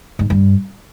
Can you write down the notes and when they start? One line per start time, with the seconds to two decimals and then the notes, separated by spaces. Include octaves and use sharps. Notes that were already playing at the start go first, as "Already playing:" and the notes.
0.19 G#2
0.30 G2